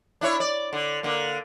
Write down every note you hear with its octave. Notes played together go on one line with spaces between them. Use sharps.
D4 E4 C#5
D5
D3
D3 A#3